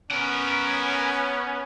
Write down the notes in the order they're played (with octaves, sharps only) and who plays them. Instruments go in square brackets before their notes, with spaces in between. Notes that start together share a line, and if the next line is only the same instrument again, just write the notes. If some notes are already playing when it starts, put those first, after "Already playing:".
[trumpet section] B3 C#4 [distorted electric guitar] A#4 F#5